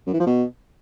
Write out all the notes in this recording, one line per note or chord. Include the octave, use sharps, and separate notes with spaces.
F#2
E3
F3
B2